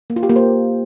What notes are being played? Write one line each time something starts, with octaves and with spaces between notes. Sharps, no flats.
A#3
F4
G4
A#3
C5